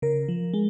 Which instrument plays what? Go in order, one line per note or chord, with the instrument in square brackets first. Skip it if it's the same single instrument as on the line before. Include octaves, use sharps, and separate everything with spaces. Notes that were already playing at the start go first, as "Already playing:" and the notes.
[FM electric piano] C#3 A#4
F3
G#3